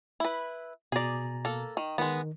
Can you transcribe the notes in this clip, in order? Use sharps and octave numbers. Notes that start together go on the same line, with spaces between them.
E4 B4
B2 G#4 D5 A#5
A#3 A4
D#3
D#3 G#3 B3